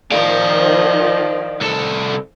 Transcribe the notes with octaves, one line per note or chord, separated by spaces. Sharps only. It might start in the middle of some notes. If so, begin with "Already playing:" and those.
D#3 F3 D5 F5
C2 A4